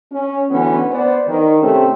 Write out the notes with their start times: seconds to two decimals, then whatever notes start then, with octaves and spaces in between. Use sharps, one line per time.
0.11 C#4
0.49 D2 E3 B3 C#4
0.91 B3 C5 D5
1.27 D#3
1.60 G#2 C3 A3 C4 C#4